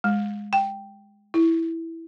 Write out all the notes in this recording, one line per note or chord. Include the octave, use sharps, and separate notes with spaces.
G#3
G5
E4